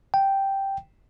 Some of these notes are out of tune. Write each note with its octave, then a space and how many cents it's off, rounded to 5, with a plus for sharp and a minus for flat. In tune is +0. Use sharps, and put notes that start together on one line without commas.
G5 -5